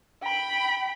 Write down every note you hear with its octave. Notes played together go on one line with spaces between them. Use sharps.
G5 B5